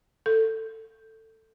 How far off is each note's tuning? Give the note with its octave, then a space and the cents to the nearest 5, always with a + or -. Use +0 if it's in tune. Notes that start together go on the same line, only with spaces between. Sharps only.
A4 +15